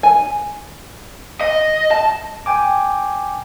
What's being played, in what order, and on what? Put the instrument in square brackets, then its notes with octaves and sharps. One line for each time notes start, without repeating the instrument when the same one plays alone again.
[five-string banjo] G#5
[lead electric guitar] D#5
A5
[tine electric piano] G5 G#5 D6